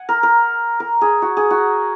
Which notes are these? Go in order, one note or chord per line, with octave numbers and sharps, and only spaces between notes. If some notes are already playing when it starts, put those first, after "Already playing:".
Already playing: F#5 G#5
A#4
A#4
A#4
G#4
F#4
G#4
F#4